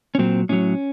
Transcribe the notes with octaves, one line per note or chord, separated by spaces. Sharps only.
C#4
A#2 F#3 C4
A2 F#3 C#4